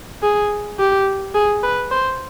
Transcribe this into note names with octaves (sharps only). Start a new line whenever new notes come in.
G#4
G4
G#4
B4
C5